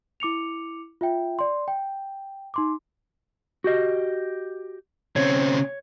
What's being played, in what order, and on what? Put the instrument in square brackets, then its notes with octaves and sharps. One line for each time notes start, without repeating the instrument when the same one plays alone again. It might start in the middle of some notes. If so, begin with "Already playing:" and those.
[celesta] E4 D6 C#7 F7
F4 E5 G5
D5 C6
G5
D#4 C6 D6
[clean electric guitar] F#4 G4 D#5
[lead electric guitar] C#3 C4 [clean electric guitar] C#5